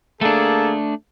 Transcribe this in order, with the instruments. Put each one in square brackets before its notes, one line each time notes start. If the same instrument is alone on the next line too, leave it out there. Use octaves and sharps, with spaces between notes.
[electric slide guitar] A3 D4 [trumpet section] A#3 G#4 A4